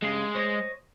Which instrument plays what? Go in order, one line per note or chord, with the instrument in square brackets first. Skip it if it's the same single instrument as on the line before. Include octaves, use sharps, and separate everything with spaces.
[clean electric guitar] G2 C#3 C6 [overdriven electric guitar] G#3
[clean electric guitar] C5 C#5 D#5